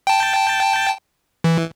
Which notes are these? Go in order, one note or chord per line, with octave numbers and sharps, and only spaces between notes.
G5 A5
E3